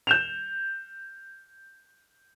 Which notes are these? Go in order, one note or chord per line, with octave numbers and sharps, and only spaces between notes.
G6 E7 F7